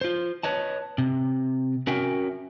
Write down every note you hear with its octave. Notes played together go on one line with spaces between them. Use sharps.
F4 C5
B4 C#5 D#5 A5
C3
C#4 F#4 A#4 E5 G5 G#5